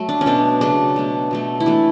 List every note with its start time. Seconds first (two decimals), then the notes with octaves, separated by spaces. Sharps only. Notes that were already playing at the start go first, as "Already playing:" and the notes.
Already playing: F#3 A3
0.09 D4
0.21 C#4
0.26 B2 A3 D4
0.61 C#3 F#3 A3 D4
0.96 B2 A3
1.31 B2 F#3 A3
1.60 E4
1.66 E3 A3 D4